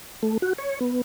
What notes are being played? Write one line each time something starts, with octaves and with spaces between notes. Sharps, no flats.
A3
F#4
C#5
B3